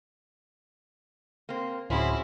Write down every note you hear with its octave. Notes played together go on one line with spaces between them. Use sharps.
A#3 C4
D1 F3 C4 C#4 E4 F#4 G#4